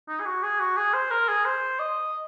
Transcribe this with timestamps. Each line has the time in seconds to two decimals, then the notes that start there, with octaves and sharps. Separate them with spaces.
0.08 D#4
0.20 G#4
0.26 F#4
0.43 G#4
0.60 F#4
0.77 G#4
0.94 C5
1.11 A#4
1.28 G#4
1.45 C5
1.79 D#5